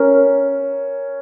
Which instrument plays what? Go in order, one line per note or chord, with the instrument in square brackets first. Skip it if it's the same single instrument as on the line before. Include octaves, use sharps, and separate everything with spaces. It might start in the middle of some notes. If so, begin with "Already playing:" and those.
Already playing: [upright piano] C#4 [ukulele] A#4